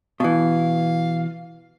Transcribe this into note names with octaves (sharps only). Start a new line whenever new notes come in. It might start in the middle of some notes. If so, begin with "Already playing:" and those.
B2 E3 F5